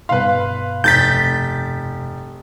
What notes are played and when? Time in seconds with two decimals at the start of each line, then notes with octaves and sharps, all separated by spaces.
0.09 G2 B2 B4 F5 C6
0.84 F1 G6 A6 B6